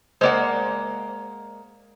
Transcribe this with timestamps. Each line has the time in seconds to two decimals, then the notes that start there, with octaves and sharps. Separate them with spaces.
0.21 G#3 A#3 C5 D5 F#5